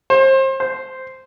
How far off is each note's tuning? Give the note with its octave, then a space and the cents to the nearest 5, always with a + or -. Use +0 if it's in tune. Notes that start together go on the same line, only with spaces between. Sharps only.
C5 +30
C5 -5